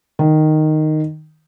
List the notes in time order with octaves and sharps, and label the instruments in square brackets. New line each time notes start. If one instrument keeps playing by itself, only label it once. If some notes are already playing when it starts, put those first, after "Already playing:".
[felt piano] D#3